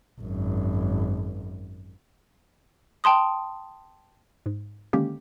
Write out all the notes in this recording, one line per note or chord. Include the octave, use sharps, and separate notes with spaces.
G#1 F#2
G5 A5 C6 D#6
G#2
D3 D#3 G#3 A#3 C#4 G4